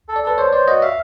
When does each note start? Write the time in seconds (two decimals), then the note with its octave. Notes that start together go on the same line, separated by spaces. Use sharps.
0.09 A4
0.16 D5
0.24 A4 B4
0.38 C5 C#5
0.53 C5 D5
0.67 F#4 D#5
0.82 E5 F5